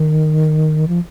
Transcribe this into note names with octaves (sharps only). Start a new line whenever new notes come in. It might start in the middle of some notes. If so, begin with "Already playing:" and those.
Already playing: D#3
F3